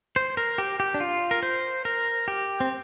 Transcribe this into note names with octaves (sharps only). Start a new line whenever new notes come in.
C5
A#4
G4
G4
D4
F4
A#4
C5
A#4
G4
C4